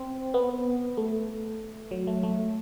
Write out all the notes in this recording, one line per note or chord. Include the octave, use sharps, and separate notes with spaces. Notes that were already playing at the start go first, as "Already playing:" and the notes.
Already playing: C4
B3
A3
F#3
A3
A3